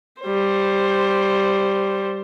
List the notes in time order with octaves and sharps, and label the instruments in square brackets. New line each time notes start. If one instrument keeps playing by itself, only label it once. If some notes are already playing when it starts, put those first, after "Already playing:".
[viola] G3 C5